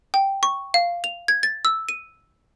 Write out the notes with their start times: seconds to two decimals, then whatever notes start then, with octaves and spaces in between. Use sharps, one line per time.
0.14 G5
0.43 C#6
0.74 F5
1.04 F7
1.28 G#6
1.43 A6
1.65 E6
1.89 D#7